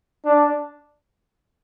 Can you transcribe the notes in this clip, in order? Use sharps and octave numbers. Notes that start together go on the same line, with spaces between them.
D4